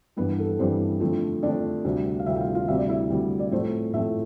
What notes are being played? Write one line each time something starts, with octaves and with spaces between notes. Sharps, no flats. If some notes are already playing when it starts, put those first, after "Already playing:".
G2 E3 G3 B3 B4
A4
G2 E3 G3 C4 C5
F2 D3 F3 A3
F2 D3 F3 A3 D4 D5
D2 C3 G3 C4
F5
D2 C3 G3 C4 E4 E5
G5
F4 F5
F4 F5
D2 C3 G3 E5
D5
E4 E5
D2 C3 G3
D5
A2 F3 A3 C4 C5
A2 F3 A3 C4 E4 E5